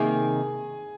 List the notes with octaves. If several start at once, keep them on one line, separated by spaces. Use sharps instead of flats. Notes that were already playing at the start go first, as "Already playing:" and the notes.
Already playing: C3 D#3 A#3 D#4 G#4 G#5